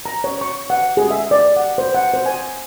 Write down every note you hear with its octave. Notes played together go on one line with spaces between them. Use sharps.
A#5
C#5
C#6
F#5
G#4
E5
D5
F#5
C5
F#5
C5
G#5